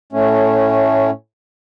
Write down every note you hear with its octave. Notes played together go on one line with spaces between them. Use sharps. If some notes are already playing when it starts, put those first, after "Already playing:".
A2 A3 C#4